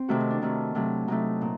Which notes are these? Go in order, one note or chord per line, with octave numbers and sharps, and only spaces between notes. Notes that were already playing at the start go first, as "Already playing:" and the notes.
Already playing: C4
C3 D#3 A3 F#4
D#4
D4
C3 D#3 A3
C3 F#3 A3
C3 F#3 A3 D#4
A#2